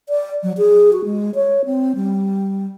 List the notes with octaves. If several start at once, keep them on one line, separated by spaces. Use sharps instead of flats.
D5
F#3
G#4
F#4
G#3
C#5
C4
G3